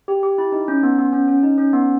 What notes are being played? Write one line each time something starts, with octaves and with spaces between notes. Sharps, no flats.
G4
G4
E4
D#4
C#4
B3
B3
C#4
C#4
D#4
C#4
B3